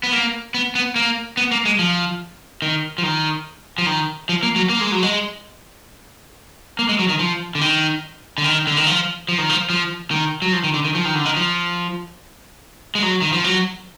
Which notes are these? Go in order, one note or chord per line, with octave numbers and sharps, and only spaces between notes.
B3
A#3
B3
B3
A#3
B3
A#3
G#3
F3
D#3
F3
D#3
F3
D#3
F3
A#3
F#3
A#3
G#3
F#3
G#3
A#3
G#3
F#3
D#3
F3
D3
D#3
D3
D#3
D3
D#3
F3
F3
D#3
F3
F3
D#3
F#3
F3
D#3
D3
D#3
F3
D#3
D3
D#3
F3
G#3
F#3
D#3
F3
F#3